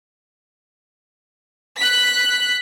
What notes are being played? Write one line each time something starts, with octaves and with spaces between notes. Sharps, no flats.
F#6 B6